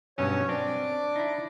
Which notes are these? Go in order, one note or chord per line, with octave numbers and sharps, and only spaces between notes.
G2 B2 F#3 C#4 C#5
C4 D4 D5 D6
D#4 E4